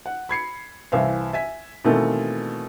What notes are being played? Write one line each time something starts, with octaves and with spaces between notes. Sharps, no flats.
F#5
B5 G#6 C7 C#7
C2 E3 C5 E5 F5
E5 G#5 B6
B2 D#3 E3 A3 A#3 C4